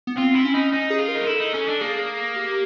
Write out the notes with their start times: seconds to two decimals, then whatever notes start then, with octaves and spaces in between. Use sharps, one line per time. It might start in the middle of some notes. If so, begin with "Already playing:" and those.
0.07 B3
0.17 C4 F4
0.35 E4
0.45 C#4
0.54 D#4
0.73 D#4
0.90 G#4
0.99 F4
1.08 A#4
1.16 D#4
1.27 E4 A4
1.40 D#4
1.54 C#4 A4
1.68 D4
1.81 A#3 G#4
2.36 G4